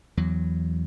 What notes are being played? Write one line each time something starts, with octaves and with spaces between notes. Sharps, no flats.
E2 F#3